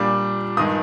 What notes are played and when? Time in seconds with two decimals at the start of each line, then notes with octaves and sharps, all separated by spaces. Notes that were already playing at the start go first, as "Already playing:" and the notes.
Already playing: A#2 G3 D4 D6
0.57 G2 D#3 G#3 D#6